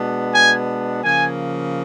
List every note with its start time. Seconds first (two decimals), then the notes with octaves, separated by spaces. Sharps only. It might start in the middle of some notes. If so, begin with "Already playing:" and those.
Already playing: B2 G#3 B3 D4
0.32 G#5
1.03 C#3 F3 A#3 G#5